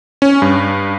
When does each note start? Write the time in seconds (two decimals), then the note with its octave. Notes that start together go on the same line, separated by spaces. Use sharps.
0.22 C#4
0.42 G2